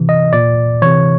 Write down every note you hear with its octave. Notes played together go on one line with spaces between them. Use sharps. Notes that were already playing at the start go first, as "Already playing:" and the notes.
Already playing: C3 E3
D#5
A#2 D5
C3 E3 C#5